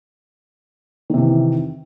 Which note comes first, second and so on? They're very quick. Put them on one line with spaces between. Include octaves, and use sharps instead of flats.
D#3 C3 E3